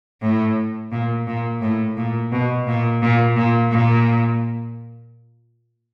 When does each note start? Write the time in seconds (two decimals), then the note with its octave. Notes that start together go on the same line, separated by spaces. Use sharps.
0.22 A2
0.92 A#2
1.27 A#2
1.61 A2
1.97 A#2
2.32 B2
2.67 A#2
3.02 A#2
3.36 A#2
3.71 A#2